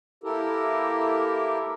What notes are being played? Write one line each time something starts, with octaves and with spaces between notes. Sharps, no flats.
A#3 E4 G4 A4 A#4